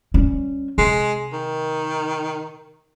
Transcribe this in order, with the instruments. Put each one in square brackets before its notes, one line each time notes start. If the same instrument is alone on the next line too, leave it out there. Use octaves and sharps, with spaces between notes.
[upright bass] G3 C#4
[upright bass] C3 [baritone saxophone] G#3
[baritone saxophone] D#3